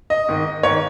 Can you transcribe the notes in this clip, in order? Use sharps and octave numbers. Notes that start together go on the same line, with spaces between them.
D#5
G#2 D#3
G#2 D#3 C#5